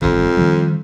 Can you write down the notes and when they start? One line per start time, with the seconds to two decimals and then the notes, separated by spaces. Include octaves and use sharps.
0.02 G1 F2 D#3
0.37 D#3 F3 G3